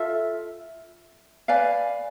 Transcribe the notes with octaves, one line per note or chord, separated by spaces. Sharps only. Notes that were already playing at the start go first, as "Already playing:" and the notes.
Already playing: F4 A4 E5
B4 D5 F5 G#5